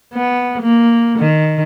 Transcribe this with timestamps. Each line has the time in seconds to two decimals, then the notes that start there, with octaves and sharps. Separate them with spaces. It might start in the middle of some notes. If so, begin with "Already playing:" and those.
0.13 B3
0.62 A#3
1.18 D#3